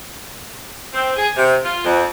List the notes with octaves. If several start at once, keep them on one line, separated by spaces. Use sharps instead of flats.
C4
G#4
C3
F4
F2